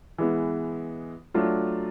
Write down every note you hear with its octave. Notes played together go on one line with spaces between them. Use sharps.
E3 G#3 B3
F#3 A3 D4 F4